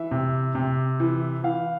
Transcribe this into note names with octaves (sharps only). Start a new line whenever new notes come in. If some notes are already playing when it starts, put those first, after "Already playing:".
Already playing: E3 E5
C3
C3
E3
E3 F5